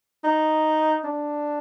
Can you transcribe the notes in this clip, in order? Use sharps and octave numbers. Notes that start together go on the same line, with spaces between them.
D#4
D4